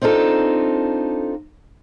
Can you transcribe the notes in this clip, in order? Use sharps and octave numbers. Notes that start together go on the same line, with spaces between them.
C4 D4 D#4 F4 A4